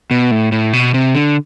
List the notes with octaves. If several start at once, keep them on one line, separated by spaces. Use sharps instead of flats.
B2
A2
A2
B2
C3
D3